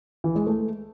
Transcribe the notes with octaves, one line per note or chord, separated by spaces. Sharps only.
E3
G#3
A3